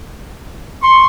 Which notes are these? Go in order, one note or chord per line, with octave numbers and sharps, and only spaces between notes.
C6 C#6